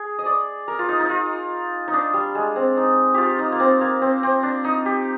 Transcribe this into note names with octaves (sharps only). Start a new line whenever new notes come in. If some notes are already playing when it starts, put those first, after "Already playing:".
Already playing: G#4
D#5
D5
A#4
F4
D#4
D#4
F4
D#4
D4
G3
G#3
C4
D#4
F4 G4
D#4
A#3
C4
A#3
C4
C4
D4
D#4
G4